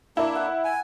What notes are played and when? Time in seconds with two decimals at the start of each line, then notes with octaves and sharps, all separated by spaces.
0.17 A#3 D4 E4
0.35 F#5
0.64 G#5